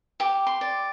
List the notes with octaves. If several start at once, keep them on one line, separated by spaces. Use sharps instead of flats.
G4 D6
C6
D5